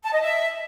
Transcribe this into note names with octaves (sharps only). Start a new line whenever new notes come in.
A5
D#5
E5